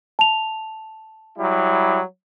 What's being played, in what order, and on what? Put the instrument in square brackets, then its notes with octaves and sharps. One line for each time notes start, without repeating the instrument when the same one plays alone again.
[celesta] A5 F7
[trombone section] F#3 G3 E4